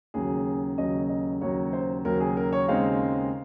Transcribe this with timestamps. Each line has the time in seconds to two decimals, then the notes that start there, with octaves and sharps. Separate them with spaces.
0.14 D#2 C#3 F#3 G#4
0.77 D#2 C#3 F#3 D#5
1.09 D#5
1.41 D#2 C#3 F#3 C#5
1.73 C5
2.05 D#2 C#3 F#3 A#4
2.20 G#4
2.37 A#4
2.52 C#5
2.68 D#2 C#3 G#3 C4 D#4 F5